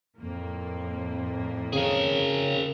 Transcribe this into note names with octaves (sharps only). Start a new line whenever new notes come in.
F2 A2 A#3
C#3 G#4 A#4